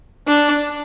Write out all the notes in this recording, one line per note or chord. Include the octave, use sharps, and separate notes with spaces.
D4